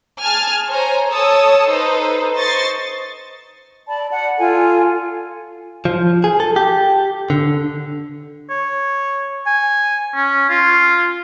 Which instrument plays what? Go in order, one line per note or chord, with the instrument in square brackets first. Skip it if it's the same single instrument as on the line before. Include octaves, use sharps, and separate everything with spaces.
[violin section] G#4 G#5 A5 F6 G#6
C5 C#5 G#5 A#5
A4 C#5 A5 D#6 E6
D#4 A4 B4 C5
C5 D#5 C#6 A6 C7
[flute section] D5 A5 B5
D5 F#5
F4 A4 G#5
[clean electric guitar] F3
G#4
A4
G4
D3
[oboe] C#5
G#5
C#4
F4